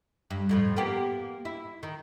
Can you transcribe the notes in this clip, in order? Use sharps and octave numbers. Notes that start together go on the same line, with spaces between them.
G2
F2 A2 F3
A#3 B3 G4
E4
D#3